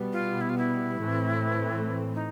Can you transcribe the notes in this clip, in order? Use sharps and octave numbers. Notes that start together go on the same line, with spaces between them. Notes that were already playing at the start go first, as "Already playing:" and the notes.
Already playing: B2 G3 B3
F4
E4
F4
E4
A2 E3 A3 C4
D#4